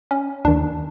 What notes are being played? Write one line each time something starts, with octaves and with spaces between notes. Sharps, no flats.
C#4
D#2 D#3 D4